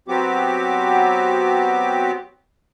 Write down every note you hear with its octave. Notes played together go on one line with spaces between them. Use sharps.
F#3 B3 C4 F#4 G4 D6